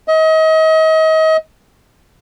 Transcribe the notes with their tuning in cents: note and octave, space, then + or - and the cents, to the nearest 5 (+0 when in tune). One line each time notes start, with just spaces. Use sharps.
D#5 +35